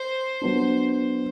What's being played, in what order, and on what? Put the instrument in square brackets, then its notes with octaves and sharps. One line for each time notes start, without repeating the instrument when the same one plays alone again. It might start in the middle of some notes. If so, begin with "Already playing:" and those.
Already playing: [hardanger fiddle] C5
[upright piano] F#3 B3 D4
[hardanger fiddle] C5